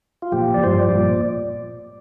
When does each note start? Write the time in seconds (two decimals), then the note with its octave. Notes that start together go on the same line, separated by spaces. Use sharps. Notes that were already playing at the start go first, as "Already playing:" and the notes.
0.22 F4
0.32 A#2 F3 G4
0.54 D5
0.63 G2 F3 C5
0.79 D5
0.95 A#2